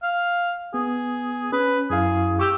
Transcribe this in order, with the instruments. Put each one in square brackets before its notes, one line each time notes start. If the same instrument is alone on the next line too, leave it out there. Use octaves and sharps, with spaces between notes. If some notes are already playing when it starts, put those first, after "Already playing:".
[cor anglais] F5
[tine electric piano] B3 [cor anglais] G#4
[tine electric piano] C#4 [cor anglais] B4
[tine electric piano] F#2 E4 F5 [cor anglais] G#4
[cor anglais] G4 [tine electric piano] C#6 E6 G6